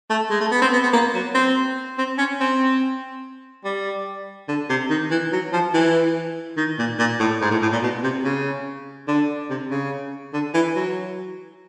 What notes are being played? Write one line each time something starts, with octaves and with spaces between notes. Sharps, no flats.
A3
G#3
A3
B3
C4
B3
B3
A#3
F#3
C4
C4
C#4
C4
G3
D3
C3
D#3
E3
F#3
F3
E3
D#3
A#2
A#2
A2
G#2
A2
A2
A#2
B2
C3
C#3
D3
C3
C#3
D3
E3
F#3